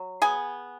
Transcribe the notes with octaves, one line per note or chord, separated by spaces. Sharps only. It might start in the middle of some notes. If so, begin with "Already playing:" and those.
Already playing: F#3
B3 G#4 G#5